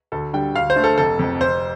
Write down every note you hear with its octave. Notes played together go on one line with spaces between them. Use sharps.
D2 A4
D3 G3 G5
D2 F5
C5
D3 A3
A4
F1 A4
F2 F3
F1 C5